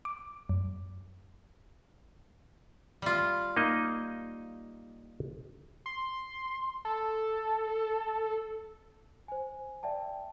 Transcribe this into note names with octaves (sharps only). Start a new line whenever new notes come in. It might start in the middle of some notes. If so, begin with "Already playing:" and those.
D6
F#2
G3 F4
A#3 D#4 D#5
C6
A4
C5 G#5
D5 E5 G5 A5